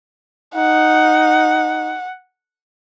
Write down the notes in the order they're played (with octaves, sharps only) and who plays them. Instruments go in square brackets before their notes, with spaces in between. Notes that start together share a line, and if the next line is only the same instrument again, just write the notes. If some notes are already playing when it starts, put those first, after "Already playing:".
[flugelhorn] D#4 [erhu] F#5